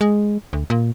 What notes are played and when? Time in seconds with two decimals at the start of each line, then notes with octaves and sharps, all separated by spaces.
0.01 G#3
0.53 D2
0.70 A#2